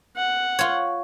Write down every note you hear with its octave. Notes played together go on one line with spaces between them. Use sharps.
F#5
F4 C#5